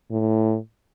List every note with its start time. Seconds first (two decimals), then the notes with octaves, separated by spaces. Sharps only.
0.11 A2